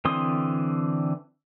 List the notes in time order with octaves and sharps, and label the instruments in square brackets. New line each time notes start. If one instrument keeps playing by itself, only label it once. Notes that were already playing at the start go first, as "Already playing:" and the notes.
[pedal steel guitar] D3 E3 C4 C6 D#6